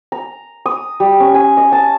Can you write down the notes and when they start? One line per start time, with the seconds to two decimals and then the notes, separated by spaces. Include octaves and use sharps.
0.12 A#5
0.66 D#6
1.00 G3
1.20 C#4
1.35 G#5
1.57 D#5
1.72 A5